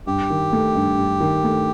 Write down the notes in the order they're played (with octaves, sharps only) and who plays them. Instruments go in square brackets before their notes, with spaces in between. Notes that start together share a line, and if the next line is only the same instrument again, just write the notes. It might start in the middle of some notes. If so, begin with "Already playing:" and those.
[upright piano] G2 [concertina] G4
[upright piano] D#3
A3
G2
G2
D#3
A3